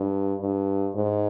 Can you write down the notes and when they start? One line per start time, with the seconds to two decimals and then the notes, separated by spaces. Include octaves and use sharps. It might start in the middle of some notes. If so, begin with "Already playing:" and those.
Already playing: G2
0.41 G2
0.95 G#2